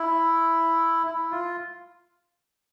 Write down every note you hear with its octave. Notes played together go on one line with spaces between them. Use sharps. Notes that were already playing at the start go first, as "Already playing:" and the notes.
Already playing: E4
E4
F4